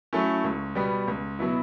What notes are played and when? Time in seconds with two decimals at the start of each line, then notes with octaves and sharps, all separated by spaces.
0.13 F#3 A3 C#4 E4
0.44 C#2
0.75 B2 G3 B3
1.08 C#2
1.39 B2 F#3 B3 E4